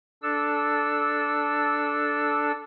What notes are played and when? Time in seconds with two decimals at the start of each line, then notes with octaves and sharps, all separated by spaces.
0.23 D4 A4 E6